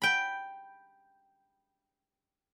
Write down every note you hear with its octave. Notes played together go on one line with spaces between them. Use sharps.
G5 B5